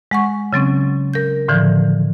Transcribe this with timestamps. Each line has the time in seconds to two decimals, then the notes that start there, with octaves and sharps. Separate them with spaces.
0.11 G#3 F#5 C#6
0.53 C#3 F#3 C4 C#4
1.14 A#4 G6
1.48 A2 D3 E3 F3